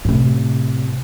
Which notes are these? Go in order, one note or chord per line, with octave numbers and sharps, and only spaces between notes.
A2 C3